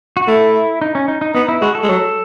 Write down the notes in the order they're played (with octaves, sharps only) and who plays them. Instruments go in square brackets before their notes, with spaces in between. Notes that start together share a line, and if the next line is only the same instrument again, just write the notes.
[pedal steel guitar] F#4
[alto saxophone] A3 [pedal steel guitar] E4
[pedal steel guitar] D#4
C#4
D#4
D#4
[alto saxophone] B3 [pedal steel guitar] D#4
[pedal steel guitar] E4
[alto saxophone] G#3 [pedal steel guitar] F#4
[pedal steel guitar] A4
[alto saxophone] G#3
F#3